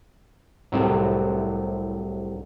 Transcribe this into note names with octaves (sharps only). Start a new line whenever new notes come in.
C2 A2 C3 F#3